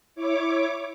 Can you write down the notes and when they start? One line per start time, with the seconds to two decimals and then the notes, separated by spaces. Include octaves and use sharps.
0.15 E4 C#5 D6